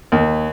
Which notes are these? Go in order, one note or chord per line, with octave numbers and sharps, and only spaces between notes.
D#2